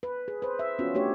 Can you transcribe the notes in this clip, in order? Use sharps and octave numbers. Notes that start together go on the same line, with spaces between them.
B4
G#4
B4 C5
E5
B3 C#4 F4 F#4
A3 D4 F#4 G4 C#5